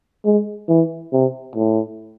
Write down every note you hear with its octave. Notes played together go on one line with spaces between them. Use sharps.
G#3
E3
C3
A2